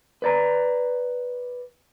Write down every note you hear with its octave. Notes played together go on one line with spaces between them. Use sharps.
B4 D5 A#5